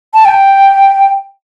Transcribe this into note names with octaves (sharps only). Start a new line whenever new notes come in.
A5
G5